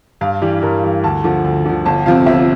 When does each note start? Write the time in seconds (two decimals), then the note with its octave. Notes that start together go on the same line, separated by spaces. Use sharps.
0.21 G2 F5
0.42 E3 G3
0.63 G2 A#4
0.83 E3 G3
1.03 D2 A5
1.24 D3 F3
1.44 D2
1.65 D3 F3
1.86 G1 A5
2.06 F2 C3 F3 C4 F5
2.26 G1 E5